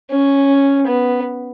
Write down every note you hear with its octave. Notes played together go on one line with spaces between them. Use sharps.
C#4
B3